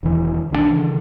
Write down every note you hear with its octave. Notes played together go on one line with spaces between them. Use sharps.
E1 D#3 E3
B1 D#3 F3 D4
C#3 E3